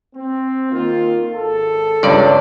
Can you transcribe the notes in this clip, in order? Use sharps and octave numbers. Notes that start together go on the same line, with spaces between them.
C4
D#3 A#3 F4
G#1 A4
C#2 G2 D5